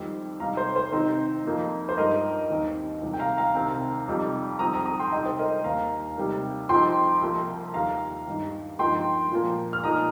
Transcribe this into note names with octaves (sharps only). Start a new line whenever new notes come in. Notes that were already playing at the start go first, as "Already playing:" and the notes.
Already playing: F2 D#3 G3 C4 D#4
C3 G3 D#4 F5 A#5
C5
C5
C3 D#3 C4 D#4 C5
F2 F3 A#3 D#4
C5
G2 G3 D#4 A#4 D#5
D#2 D#3 C4 D#4
C2 C3 D#3 G3
G5
F5 A#5
F5 A#5
C2 C3 D#3 C4
F2 C3 G3 D#4
F2 D#3 G3 C4 A#5 D#6
A#5 D#6
A#5 D#6
G5 C6
C3 G3 D#4 D#5 G5
C5
A#4 D#5
D#2 D#3 A#3 F5 A#5
C3 G3 A#3 D#4
F2 F3 C4 D#4 G5 C6
C2 C3 F3 A#3
D#2 D#3 G3 F5 A#5
G2 D#3 G3 D#4
G2 F3 A#3 D#4 G5 C6
A#2 F3 A#3
F6
A#2 F3 A#3 D#4 A#5 D#6